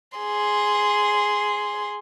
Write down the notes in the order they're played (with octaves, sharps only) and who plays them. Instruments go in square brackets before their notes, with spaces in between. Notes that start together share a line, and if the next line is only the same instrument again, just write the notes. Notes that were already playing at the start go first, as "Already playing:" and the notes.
[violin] G#4 C6